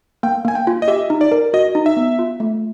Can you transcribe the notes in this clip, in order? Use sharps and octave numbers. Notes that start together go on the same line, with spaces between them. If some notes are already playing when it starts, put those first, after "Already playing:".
A#3 G5
A#3 G#5
G5
F4
D#5
G4 E5
D#4
D5
A#4
F#4 D#5
D#4
E5
B3
F4
A3